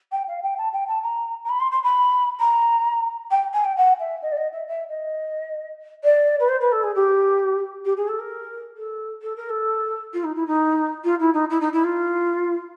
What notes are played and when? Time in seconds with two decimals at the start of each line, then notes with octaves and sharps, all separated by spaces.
0.12 G5
0.28 F5
0.43 G5
0.58 A5
0.73 G5
0.88 A5
1.03 A#5
1.45 A#5
1.50 B5
1.60 C6
1.72 C6
1.83 B5
2.40 A#5
3.31 G5
3.53 G#5
3.65 G5
3.77 F#5
4.00 E5
4.22 D#5
4.32 D5
4.37 D#5
4.53 E5
4.68 E5
4.89 D#5
6.04 D5
6.40 B4
6.49 C5
6.61 B4
6.72 A4
6.83 G#4
6.95 G4
7.85 G4
7.97 G#4
8.08 A4
8.20 A#4
8.77 A4
9.22 A4
9.36 A#4
9.49 A4
10.13 F4
10.24 D#4
10.35 E4
10.47 D#4
11.04 F4
11.20 E4
11.34 D#4
11.50 E4
11.61 D#4
11.73 E4
11.84 F4